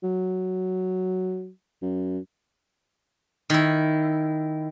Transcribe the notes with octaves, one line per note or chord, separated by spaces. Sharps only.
F#3
F#2
D#3 E4